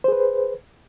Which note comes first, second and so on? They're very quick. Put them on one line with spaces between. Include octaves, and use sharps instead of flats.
C5 G#4 B4